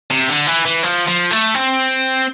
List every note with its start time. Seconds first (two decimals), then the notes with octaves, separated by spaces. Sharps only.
0.11 C3
0.29 D3
0.47 E3
0.66 E3
0.83 F3
1.07 F3
1.31 A3
1.54 C4